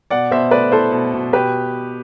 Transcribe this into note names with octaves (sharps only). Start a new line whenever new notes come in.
B2 D5 F#5
B2 C5 E5
A3 B4 D5
E4 A4 C5
B2
B2
B2 G4 B4